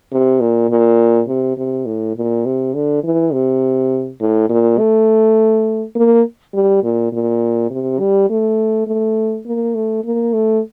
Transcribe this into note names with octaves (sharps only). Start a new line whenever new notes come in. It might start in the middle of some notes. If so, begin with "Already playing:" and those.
C3
A#2
A#2
C3
C3
A2
A#2
C3
D3
E3
C3
A2
A#2
A3
A#3
G3
A#2
A#2
C3
G3
A3
A3
A#3
A3
A#3
A3